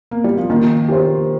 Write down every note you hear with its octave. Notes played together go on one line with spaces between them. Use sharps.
A#3
G3
F3
D#3 A#3
G4 C5